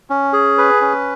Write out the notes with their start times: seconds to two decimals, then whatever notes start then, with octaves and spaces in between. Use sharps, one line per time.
0.10 C#4
0.33 G#4
0.58 B4
0.81 C#4